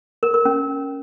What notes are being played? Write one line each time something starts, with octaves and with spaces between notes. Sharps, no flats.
A#4
A#4
C#4